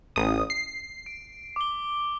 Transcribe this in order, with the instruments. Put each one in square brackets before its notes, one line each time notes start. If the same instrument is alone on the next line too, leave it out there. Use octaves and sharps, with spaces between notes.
[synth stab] A1 D#6
C7
[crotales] D7
D6 G7